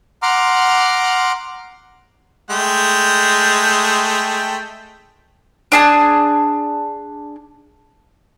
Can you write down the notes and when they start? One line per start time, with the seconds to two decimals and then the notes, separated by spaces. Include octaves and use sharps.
0.22 F#5 A#5 C6 D6 F6
2.50 G#3 A3 G5
5.72 D4 G#4 A5